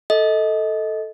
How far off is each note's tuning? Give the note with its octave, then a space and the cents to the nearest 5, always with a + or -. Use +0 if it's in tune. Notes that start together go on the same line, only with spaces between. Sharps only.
A4 +0 D#5 +20